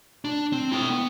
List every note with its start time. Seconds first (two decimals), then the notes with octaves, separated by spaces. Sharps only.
0.25 D4
0.53 C4
0.72 E4 G5
0.90 B3